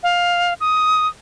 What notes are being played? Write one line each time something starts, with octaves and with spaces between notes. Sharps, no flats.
F5
D#6